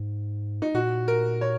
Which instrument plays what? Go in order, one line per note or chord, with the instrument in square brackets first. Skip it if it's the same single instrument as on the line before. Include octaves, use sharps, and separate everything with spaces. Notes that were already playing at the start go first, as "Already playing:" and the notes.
Already playing: [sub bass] G#2
[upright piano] D#4
[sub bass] A#2 [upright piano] F#4
[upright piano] A#4
C#5